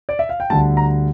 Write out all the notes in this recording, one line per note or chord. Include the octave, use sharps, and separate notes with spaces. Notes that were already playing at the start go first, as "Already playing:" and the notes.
D5
E5
F5
G5
D2 D3 G3 A5
A#5